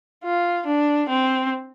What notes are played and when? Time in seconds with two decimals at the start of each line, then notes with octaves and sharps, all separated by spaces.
0.24 F4
0.66 D4
1.09 C4